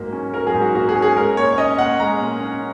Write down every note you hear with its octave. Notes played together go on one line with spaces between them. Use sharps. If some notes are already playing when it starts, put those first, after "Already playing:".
Already playing: G#2 F#3 A#3
C#4
F#3 A#4
G#4
G#2
F#4
A#3 F#4
G#4
C#4
G#4
G#3 A#4
A#2 C#5
C#5
C#4 D#5
A#2 F#5
G#3 A#5
A#2
C#4